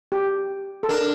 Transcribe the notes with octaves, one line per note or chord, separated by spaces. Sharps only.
G4
A4
D4 A#4